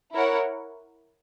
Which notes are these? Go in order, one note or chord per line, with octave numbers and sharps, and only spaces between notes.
E4 A#4 C#5 F#5